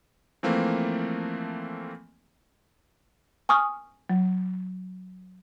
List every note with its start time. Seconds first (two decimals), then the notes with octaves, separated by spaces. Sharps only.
0.43 E3 F3 A3 A#3 C4
3.49 G#5 C#6 D#6 F6
4.10 F#3